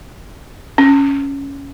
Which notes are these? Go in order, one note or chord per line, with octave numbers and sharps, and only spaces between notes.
C#4